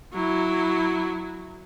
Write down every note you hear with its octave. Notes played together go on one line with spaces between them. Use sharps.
F#3 E4